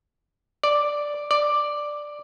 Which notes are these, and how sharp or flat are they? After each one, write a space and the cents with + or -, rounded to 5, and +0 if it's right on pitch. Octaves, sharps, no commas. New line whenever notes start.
D5 +0
D5 +5